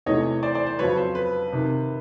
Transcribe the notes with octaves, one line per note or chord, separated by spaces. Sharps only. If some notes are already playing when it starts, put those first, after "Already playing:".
E2 C3 E3 A3 C#5 D#5
C5 D5
C5 D5
C5
F2 C#3 F#3 B4 C#5
C5
B4
C3 D#3